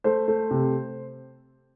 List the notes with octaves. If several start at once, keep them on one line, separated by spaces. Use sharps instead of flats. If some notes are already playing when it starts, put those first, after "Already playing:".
A3 C5
A3
C3